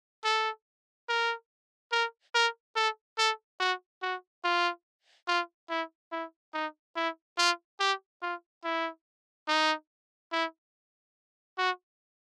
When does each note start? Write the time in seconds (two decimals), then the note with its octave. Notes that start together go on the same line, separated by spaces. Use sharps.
0.24 A4
1.09 A#4
1.92 A#4
2.35 A#4
2.76 A4
3.18 A4
3.60 F#4
4.02 F#4
4.44 F4
5.28 F4
5.70 E4
6.12 E4
6.54 D#4
6.96 E4
7.38 F4
7.80 G4
8.22 F4
8.64 E4
9.48 D#4
10.32 E4
11.58 F#4